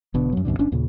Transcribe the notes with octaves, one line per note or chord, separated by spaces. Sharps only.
E1 B2 D3
F#2 F#3
C2 F#2 B2 D3
G1 C#4 D4
D#2 A#2 C#3